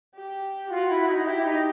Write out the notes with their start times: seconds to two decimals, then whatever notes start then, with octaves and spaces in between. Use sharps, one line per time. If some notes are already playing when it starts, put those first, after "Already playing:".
0.15 G4
0.70 F4 F#4
0.89 E4
1.08 D#4
1.26 E4 G4
1.44 D#4